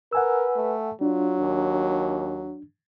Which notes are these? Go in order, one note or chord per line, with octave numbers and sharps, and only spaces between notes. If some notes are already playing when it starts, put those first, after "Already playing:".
A#4 B4 F#5 G#5 E6
A3
F#3 D4 F4
D#2